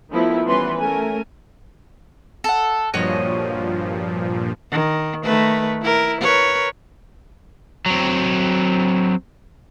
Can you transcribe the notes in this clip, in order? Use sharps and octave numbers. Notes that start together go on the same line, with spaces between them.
D#3 F3 A3 B3 E4
E3 G3 B3 C#4 B4 C6
A3 C#4 A#4 G#5
A4 F#5
G2 A#2 F3 F#4 C#5 D#5
D#3
D#3 A3 B4
E4 A#4
A#4 B4 C#5
F#3 C4